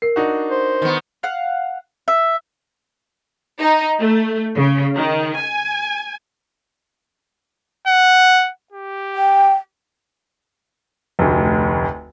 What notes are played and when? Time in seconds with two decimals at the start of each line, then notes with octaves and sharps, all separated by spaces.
0.02 A#4 C7
0.16 D4 D#4 F#4
0.51 C5
0.82 D#3 B3
1.23 F5 F#5
2.08 E5
3.60 D#4
4.00 A3
4.56 C#3
4.95 D#3
5.37 G#5
7.88 F#5
8.72 G4
9.15 G5
11.19 F1 D2